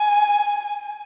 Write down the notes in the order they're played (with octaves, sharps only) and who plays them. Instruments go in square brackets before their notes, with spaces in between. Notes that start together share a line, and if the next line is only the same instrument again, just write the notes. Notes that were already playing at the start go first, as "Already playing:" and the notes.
Already playing: [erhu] G#5